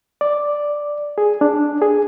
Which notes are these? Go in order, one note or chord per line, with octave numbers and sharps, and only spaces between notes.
D5
G#4
D4
G#4